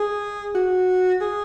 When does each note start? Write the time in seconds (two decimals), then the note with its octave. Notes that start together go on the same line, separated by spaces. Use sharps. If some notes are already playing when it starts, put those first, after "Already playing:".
Already playing: G#4
0.55 F#4
1.21 G#4